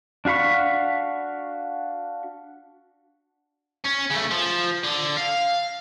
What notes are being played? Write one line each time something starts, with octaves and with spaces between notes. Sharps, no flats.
D4 F#4 F5 B5 C#6
C#4
C#3 A3
F3
D3
F5